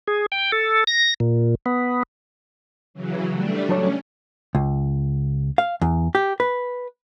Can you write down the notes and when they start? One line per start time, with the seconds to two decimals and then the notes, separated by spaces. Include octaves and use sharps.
0.07 G#4
0.32 G5
0.52 A4
0.87 A#6
1.20 A#2
1.66 B3
2.94 C#3 E3 F#3
3.30 G3 A3 D4
3.69 F#3 C#4 A4 C#5
4.55 C#2
5.58 F5
5.81 E2
6.15 G4
6.40 B4